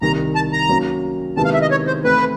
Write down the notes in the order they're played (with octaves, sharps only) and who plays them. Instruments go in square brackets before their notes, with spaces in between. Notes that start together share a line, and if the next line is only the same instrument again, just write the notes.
[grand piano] C2 C3 D#3 [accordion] A#5
[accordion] A5
A#5
[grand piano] F#3 A#3 C#4
[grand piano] C3 D#3 G#3 B3 E4 [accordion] A5
[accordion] F5
E5
D#5
C#5
C5
[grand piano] E3 A3 C4 E4 [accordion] B4